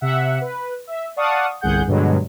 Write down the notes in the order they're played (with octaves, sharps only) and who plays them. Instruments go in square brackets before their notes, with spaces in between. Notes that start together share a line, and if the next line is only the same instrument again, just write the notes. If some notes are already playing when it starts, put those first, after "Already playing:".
[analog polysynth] C3 E5 F#5
B4
E5
D5 F5 F#5 A5 C#6 D#6
G1 C2 G#4 F#5 G6
G2 B2 D3 F#3 G#3